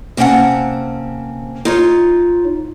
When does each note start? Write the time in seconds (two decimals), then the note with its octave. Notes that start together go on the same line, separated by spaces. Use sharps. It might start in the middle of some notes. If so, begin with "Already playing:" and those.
0.17 C3 A#3 C4 C#4 F#5 A5
1.65 D#4 F4 C#5